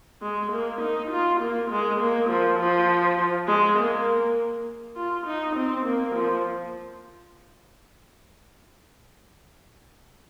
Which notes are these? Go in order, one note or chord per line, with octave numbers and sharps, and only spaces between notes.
G#3
A#3
D#4
F4
A#3
G#3
A#3
F3
F3
G#3
A#3
F4
D#4
C4
A#3
F3